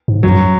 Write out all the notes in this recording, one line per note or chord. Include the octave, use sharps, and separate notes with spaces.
G#2
F#2 F#3